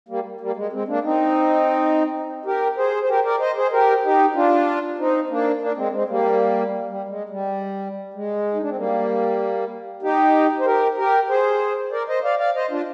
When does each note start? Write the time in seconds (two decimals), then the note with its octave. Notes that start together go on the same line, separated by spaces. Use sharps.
0.09 G3 A#3
0.41 G3 A#3
0.56 G#3
0.72 G#3 C4
0.88 A#3 D4
1.04 C4 D#4
2.45 G4 A#4
2.77 G#4 C5
3.03 C5
3.09 G4 A#4
3.25 A#4 D5
3.40 C5 D#5
3.56 G#4 C5
3.72 G4 A#4
4.03 D#4 G4
4.35 D4 F4
4.98 C4 D#4
5.30 A#3 D4
5.61 A#3 D4
5.77 G#3 C4
5.93 G#3 C4
6.08 G3 A#3
6.88 G3
7.08 G#3
7.29 G3
8.14 G#3
8.54 D#4
8.62 D4
8.69 C4
8.76 G3 A#3
10.02 D#4 G4
10.59 C5
10.66 G4 A#4
10.97 G4 A#4
11.29 G#4 C5
11.92 A#4 D5
12.08 C5 D#5
12.24 D5 F5
12.39 D5 F5
12.55 C5 D#5
12.71 D4 F4